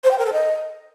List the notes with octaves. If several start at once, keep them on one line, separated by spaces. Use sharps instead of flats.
C5
G5
A#4
A4
D#5